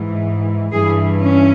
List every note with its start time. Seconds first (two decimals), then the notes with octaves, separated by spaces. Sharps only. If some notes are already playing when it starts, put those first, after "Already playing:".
Already playing: G#2 E3
0.72 G2 E3 G#4
1.22 C#4